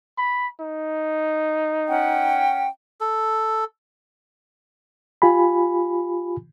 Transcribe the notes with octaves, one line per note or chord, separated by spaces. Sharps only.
B5
D#4
C#4 F#5 G5
A4
F4 G4 G#5 B5